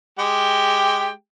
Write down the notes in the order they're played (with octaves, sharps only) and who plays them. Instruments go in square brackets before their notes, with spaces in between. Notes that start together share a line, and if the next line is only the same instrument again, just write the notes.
[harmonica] G#3 G4 G5